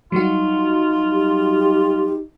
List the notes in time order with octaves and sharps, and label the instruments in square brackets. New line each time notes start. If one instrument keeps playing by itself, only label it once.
[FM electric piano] F#3 G3 F#4 [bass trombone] D#4 [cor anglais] F4
[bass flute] G4